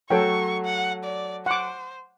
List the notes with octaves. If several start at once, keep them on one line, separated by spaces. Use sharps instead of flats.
F#3 A3 F#4 A4 C#5 G5 C#6
F#5
D5
C5 F#5 D6